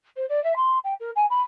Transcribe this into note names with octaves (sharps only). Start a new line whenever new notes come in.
C5
D5
E5
C6
G5
A#4
G#5
B5